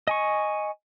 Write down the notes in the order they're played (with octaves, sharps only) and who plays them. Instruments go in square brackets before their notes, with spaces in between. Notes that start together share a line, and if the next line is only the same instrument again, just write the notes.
[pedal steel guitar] D#5 G#5 C#6